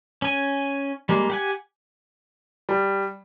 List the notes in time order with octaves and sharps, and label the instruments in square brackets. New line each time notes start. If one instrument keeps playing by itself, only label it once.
[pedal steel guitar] C#4 G#5
G3 G#3 A#3
G4 F#5 G#5
[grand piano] G3